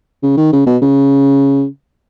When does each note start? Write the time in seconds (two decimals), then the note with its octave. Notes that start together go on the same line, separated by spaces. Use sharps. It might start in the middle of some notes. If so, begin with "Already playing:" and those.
0.22 C#3
0.37 D#3
0.52 C#3
0.67 B2
0.82 C#3